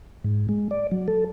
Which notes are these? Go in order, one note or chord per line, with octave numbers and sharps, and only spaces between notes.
G#2
G#3
D5
F#3
A4